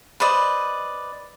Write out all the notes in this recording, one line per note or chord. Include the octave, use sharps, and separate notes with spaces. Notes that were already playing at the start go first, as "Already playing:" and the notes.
B4 C5 D5 D#5